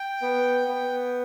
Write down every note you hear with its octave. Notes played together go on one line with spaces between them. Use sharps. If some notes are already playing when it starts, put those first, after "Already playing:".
Already playing: G5
B3
B3